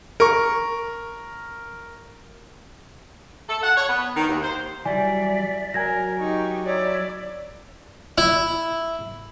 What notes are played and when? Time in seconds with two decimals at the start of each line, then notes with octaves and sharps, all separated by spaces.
0.20 A#4 C#6
3.48 A4
3.63 F#5
3.76 C#5
3.88 B3
4.15 D#3
4.28 D#2
4.42 C5
4.85 E3 F#3 G3 D5 E5 G#5
5.74 F#3 A#4 G#5 G#6 A#6
6.19 D#4 G4 C#6
6.66 E4 C#5 D5 A#5
8.18 E4